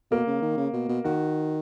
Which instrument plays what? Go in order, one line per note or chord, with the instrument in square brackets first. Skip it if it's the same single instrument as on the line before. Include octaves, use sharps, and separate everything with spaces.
[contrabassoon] B2 [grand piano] A#3
[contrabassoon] C#3
D#3
C#3
B2
B2
[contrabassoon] D#3 [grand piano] F#4